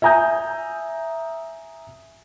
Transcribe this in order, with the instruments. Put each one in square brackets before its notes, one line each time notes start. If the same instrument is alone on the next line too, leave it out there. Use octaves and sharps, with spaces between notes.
[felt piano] E5 G#5 A#5 D#6 G6